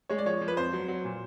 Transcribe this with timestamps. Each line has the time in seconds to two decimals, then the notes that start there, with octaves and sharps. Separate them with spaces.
0.09 G#3 C#5
0.18 D5
0.25 F3 C#5
0.41 F3
0.48 B4
0.57 F2 C5
0.73 F#3
0.88 F#3
1.04 A#2